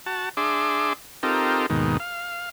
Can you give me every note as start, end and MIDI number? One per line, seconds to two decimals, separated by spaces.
0.06 0.29 66
0.06 0.29 81
0.37 0.93 62
0.37 0.93 68
0.37 0.93 76
0.37 0.93 84
0.37 0.93 86
1.23 1.66 60
1.23 1.66 63
1.23 1.66 65
1.23 1.66 67
1.23 1.66 69
1.23 1.66 70
1.70 1.97 39
1.70 1.97 44
1.70 1.97 47
1.70 1.97 51
2.00 2.49 77